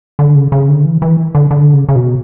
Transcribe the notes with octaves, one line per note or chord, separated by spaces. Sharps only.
D3
C#3
C#3
D3
E3
E3
D3
D3
C#3
C#3
B2